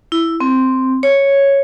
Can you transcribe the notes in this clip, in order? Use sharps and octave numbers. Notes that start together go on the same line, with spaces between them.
E4
C4
C#5